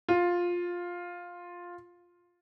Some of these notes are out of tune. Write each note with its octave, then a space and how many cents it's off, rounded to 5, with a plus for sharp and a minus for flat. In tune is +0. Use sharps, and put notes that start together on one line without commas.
F4 +10